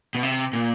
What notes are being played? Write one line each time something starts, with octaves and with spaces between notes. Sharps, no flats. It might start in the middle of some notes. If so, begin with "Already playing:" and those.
B2
C3
A#2